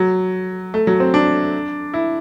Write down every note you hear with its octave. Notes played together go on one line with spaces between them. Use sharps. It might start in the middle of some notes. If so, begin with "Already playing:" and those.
Already playing: F#3
A3
F#3
C4
D4
E4